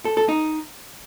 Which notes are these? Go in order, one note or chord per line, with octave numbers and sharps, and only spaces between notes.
A4
A4
D#4